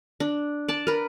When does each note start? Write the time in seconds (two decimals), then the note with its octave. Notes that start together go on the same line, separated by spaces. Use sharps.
0.20 D4
0.68 D5 A5
0.87 A#4 B4